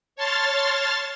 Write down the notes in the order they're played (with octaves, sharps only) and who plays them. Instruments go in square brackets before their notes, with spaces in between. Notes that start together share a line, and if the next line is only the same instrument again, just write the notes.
[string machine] C#5 A5 C6 F6 A6